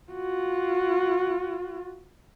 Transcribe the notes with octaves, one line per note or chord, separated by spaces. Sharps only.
F4 F#4